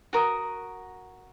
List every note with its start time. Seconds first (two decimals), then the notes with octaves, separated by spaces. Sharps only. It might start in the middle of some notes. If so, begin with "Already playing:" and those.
0.13 F#4 A#4 D#6